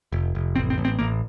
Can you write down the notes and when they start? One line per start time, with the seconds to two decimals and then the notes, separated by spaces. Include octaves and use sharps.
0.12 F1
0.35 F1
0.56 A1 C4
0.70 C4
0.78 A1
0.85 C4
0.99 A1 A#3